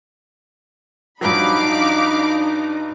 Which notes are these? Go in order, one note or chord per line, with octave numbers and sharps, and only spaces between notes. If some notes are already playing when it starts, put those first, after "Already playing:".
G2 F3 F#3 D4 D#4 F5 B5 D6